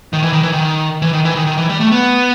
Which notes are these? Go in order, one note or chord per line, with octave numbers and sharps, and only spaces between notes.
D#3
E3
D#3
E3
D#3
E3
D#3
E3
D#3
D#3
E3
G3
A3
B3